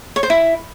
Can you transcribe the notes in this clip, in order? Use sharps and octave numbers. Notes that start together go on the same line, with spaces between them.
C#5
C5
E4